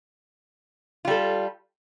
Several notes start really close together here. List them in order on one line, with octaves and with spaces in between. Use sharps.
F4 G3 A4